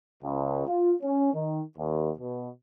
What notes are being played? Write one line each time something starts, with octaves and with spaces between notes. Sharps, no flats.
C#2
F4
C#4
D#3
D#2
B2